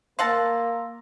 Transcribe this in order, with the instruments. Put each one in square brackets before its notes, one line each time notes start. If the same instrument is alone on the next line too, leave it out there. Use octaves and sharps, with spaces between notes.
[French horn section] A#3 A#4 [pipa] F5 F#5 A5 [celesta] C6 E6 A#6